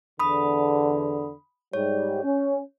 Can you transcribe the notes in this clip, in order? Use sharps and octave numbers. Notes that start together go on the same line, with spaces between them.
E2 D3 B5 D#6
G#2 G3 C#5
C#4